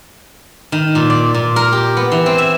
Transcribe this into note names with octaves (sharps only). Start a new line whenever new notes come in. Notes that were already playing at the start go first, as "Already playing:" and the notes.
D#3
A#2
D5
A#2
A#4
G4
B3
E3
C4
E5